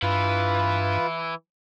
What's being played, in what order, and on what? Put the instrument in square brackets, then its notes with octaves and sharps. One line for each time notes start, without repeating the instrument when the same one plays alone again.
[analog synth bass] G2 [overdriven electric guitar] E3 E4 [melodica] F4 B4